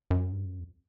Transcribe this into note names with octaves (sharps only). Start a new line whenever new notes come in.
F#2
G2
F#2
F2